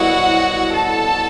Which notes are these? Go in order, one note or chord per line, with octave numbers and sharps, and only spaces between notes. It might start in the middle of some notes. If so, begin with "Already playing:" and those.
Already playing: C2 B2 F#3 B3 E4 F#4 F#5
A4 A5